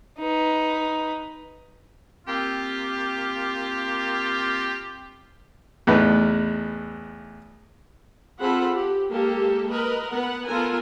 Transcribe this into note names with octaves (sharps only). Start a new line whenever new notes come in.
D#4 B4
A#3 C4 F4 G4
E2 A2 D#4 B4
C4 F4 G#4 A4 F#5 B5
G4
G#3 A#3 G4 A4
A#4 B4 D#5
B3 B4 F#5
B3 F4 A4 A#4 G#5